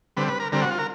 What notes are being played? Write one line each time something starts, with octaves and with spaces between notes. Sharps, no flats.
D3 G3 C4 B4
B4
A#4
D3 G3 C4 A#4
F#4
F4
A#4